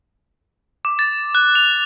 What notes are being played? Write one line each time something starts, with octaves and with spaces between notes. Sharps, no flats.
D6
A6
F#6
F7